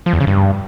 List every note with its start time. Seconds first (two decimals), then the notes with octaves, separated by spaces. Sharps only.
0.06 F3
0.13 E2
0.20 C#3
0.27 G2